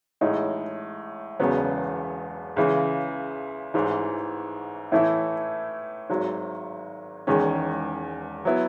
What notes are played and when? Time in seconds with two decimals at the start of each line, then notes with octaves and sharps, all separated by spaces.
0.21 A1 A2 G#3 D#4
1.40 E1 E2 C#3 F#3 B3
2.56 C#2 C#3 E3
3.74 A1 G#2 E3
4.92 A2 E3 A3 E4
6.10 G#1 G#2 F#3
7.27 E1 E2 D#3 G#3 C#4
8.45 F#3 B3 E4